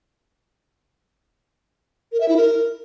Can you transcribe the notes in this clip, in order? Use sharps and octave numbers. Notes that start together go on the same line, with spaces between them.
A#4
E5
E4
A#4